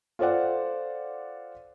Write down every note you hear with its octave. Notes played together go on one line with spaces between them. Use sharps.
F4 A4 C5 D5 F#5